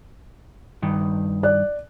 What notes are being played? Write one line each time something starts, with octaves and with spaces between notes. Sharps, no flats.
G2 D#3
D5 F#6